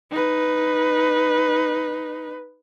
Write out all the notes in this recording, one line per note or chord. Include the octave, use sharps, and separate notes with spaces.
D#4 B4